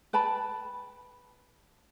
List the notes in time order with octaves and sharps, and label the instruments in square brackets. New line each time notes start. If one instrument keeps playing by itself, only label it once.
[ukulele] B4 G5 A5 B5